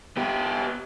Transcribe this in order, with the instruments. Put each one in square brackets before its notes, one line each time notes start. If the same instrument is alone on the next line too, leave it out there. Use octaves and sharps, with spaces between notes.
[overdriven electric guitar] B3 G4